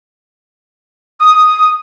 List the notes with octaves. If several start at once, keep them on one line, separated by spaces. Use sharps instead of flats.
D#6